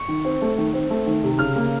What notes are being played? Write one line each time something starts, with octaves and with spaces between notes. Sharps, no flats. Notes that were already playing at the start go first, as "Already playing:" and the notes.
Already playing: C#6
D#3
C4
A3
D#3
C4
A3
D#3
C3
C#3 F6
A#3